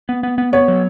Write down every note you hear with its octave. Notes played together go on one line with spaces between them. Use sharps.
B3
B3
B3
B3 C#5
F#3